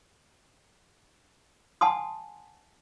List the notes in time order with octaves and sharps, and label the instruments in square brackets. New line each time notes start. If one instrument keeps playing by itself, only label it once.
[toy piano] F#5 G#5 A5 C6 D#6